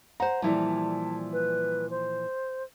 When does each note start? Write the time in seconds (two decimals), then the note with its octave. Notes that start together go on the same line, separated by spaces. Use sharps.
0.20 C5 F#5 A#5
0.42 A#2 E3 F3 G3 E4 A5
1.33 B4
1.91 C5